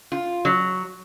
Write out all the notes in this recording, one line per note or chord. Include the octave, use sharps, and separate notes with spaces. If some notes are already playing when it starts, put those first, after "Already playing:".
F4
F#3